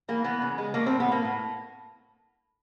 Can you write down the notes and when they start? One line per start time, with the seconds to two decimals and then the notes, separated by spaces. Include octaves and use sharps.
0.08 E3 A#3
0.24 E3 B3
0.42 C#3
0.58 G#3
0.74 A3 A#3
0.86 C4
0.91 A2
1.00 B3
1.08 A3
1.12 A#3
1.25 A2